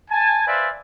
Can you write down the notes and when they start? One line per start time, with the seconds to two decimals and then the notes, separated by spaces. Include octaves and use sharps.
0.11 G#5 A5
0.46 B4 C5 D5 E5 F5 G#5